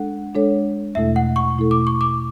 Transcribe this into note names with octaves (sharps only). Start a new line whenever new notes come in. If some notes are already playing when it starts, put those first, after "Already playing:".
Already playing: G#3 D4 A4 F#5
G#3 D4 A4 C#5
E2 B2 A3 E4 A4 E5
F#5
C#6
E2 B2 A3 E4 A4
D6
C#6
D6